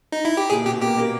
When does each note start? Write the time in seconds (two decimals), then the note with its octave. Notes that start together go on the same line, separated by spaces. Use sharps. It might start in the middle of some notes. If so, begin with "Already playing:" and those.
0.12 D#4
0.25 E4
0.37 G4
0.50 A#2 G#4
0.65 B2 G4
0.82 A#3 G4
0.97 A#3